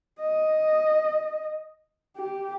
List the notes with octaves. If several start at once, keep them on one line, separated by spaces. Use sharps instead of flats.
D#5
G4